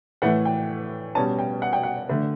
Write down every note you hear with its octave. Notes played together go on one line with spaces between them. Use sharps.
A2 E3 A3 F#5
G5
B2 G3 C#4 A5
G5
F#5
G5
F#5
D3 A3